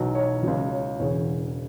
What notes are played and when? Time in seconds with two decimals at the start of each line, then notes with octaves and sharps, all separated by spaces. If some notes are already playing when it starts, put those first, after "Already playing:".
Already playing: B1 B2 F#3
0.15 C#5
0.43 C#2 C#3 F#3
0.71 C#5
0.99 E1 E2 C#3 C#5